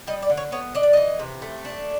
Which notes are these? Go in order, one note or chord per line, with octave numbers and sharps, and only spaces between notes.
G3 D#5
D5
D3
C#5
B3 C#5
D4 D#5
D5
E3 D#5
C3
A3
D4